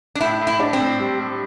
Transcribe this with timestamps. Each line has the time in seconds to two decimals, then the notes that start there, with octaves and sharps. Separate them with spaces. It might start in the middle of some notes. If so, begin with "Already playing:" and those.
0.15 D4
0.21 A2 E4
0.41 A2
0.47 E4
0.60 D4
0.73 C4
0.80 A2
1.00 G3
1.19 G3